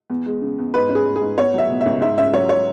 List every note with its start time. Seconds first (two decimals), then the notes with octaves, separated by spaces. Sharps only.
0.10 E2
0.26 G#3
0.42 C#3
0.58 E2
0.74 G#2 B4
0.89 C#4
0.95 G#4
1.06 G#3
1.16 G#4
1.21 G#2
1.37 B3 C#5
1.54 F#3 E5
1.70 B2
1.81 E5
1.86 C#2
2.01 G#2 E5
2.18 C#4 E5
2.33 F#3 C#5
2.49 C#5